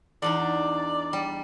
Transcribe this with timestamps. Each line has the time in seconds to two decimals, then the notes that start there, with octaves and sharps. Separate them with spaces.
0.22 E2 D4 D#4 D5
1.13 G3